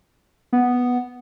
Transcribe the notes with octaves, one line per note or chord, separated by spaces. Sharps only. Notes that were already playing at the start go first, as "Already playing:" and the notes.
B3